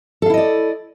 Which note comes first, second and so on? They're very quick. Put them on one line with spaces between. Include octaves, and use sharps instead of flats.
A4 F5 E4 D#5 D5